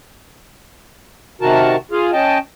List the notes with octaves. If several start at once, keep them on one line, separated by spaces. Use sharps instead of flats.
C3 D#3 F#4 A#4 A5
F4 G#4 F5
C#4 D#5 G5 A5